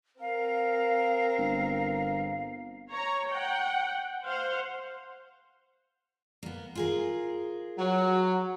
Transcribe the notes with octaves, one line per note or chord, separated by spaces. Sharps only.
C4 A#4 F5
G1
C#5 A#5
F#5 G5
C5 F5 F#5
A#3 B3
F4 G#4 A#4
F#3